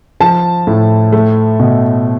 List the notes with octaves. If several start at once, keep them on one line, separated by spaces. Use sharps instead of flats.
F3 A5
A2
A3
B2